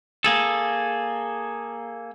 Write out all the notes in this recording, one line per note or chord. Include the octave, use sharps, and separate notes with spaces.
A#3 G#4 A4